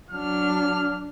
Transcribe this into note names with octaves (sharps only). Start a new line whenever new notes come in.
F#3 D4 F6